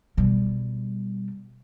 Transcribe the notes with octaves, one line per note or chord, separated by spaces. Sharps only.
B2 G3